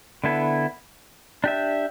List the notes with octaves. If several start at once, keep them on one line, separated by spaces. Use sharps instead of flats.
D3 B3 E4 A4
D4 G4 E5